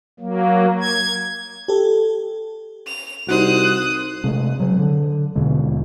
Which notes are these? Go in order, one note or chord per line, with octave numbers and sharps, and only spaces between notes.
F#3 A#3
G#6
G4 A4
F7
C2 D#4 F#4 C5 D#6 F#6
C3 G#3 A3
C#3 F#3
D3
D#2 B2 D3 G#3